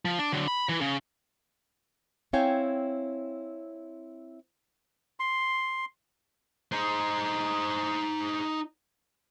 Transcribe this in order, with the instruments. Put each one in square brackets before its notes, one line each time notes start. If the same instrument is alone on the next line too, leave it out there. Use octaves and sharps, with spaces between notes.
[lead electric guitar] F3
D4
D3 F#3
B5
E3
C#3
[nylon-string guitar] C4 E4 C#5 F5 G5 G#5
[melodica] C6
[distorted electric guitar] D#4 C5